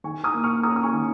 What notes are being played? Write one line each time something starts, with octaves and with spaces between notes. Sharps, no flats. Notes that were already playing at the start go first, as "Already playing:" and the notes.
D#3 G#5 C#6
A#5 D#6
A#3
C#6 F6
C#4 A#5 D#6
D#6
G#5 C#6
D#3